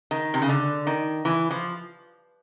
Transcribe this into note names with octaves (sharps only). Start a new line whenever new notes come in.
D#3
C3
C#3
D3
D#3
E3
F3